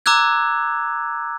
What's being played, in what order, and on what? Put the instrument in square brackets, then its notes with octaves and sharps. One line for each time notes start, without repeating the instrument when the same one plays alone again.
[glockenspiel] A#5 D6 E6 F#6 G#6